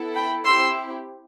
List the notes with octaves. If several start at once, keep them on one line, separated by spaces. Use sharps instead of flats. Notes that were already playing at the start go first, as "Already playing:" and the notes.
Already playing: B3 E4 A4
G5 B5
C4 E4 G4 C6 E6